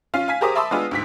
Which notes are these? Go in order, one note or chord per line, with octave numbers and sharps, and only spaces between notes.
C#4 F4 F5
F5 G#5 B6
G4 G#4 A#4 C5 D6 D#6
E5 A5 B5 C6 D6 E6
G#3 B3 D4 F4 G#4
D2 G#2 B6